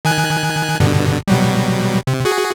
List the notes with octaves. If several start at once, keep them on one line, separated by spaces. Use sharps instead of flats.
D#3 G#5 F#6
G2 B2 D3
B2 F#3 G3
C3
F#4 G#4